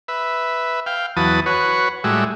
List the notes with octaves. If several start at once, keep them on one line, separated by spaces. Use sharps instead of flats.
B4 E5
F5 G5
E2 F#3 B4 A5 D#6
F#4 B4 C#5
A2 G3 G#3 F#4 E5